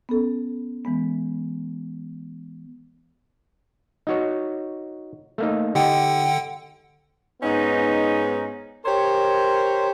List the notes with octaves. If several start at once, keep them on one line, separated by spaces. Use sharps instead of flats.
B3 C#4 A4
E3 G#3 B3
D#4 F#4 C#5
A3 A#3 D#4
D3 D#4 G4 F#5 G5
G#2 B3 C#4 D#4
G4 A#4 C5 C#5